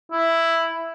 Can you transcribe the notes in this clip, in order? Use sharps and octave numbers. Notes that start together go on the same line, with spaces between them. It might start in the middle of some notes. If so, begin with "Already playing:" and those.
E4